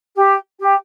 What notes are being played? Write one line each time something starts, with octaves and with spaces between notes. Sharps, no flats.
G4
G4